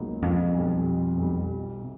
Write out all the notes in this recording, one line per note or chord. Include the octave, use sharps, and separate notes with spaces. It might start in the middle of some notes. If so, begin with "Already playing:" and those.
Already playing: C#2 B2 F#3 A#3 D#4
F2
B1 B2 G3
B1 B2 G3
C3